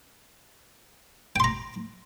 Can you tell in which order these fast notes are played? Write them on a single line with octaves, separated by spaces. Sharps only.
G5 C6 A#5